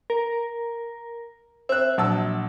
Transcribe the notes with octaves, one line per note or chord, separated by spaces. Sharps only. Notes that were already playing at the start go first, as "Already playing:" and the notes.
A#4
C4 E5 F#6
A#1 F#3 A5 E6